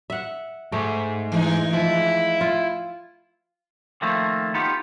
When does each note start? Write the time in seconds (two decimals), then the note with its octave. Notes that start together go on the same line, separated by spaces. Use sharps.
0.10 E5 F#5
0.72 G#2 A3
1.32 E3 G#3 D#4
1.73 F3 E4
2.41 F4
4.02 D#3 F3 A3 A#3 C4
4.54 B3 D#4 F4 G4